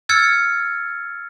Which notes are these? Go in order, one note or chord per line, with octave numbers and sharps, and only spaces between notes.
E6 F6 G#6 A6 C#7